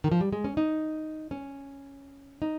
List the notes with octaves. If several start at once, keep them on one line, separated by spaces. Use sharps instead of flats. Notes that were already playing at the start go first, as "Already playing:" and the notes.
D#3
F3
G3
G#3
C#4
D#4
C#4
D#4